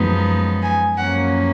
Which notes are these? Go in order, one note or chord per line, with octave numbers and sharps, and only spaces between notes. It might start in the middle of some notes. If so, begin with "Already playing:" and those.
Already playing: F#2 F3 G#3 B3 D#4
G#5
F#2 F3 A#3 C#4 F#5